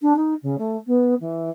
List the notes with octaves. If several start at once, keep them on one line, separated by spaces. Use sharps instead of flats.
D4
D#4
C#3
A3
B3
E3